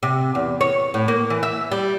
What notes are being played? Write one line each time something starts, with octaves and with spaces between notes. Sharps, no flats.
C3
E2
C#5
A2
A#3
E3
E5
G3